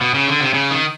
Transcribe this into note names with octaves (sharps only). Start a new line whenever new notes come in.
B2
C#3
D3
C3
C#3
D#3